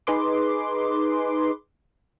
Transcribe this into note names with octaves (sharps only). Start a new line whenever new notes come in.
D#4 G#4 B4 C6 D6